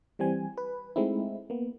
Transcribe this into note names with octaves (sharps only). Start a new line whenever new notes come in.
E3 G3 C4 G#5
B4
G#3 A3 C4 D#4 E4
A#3 B3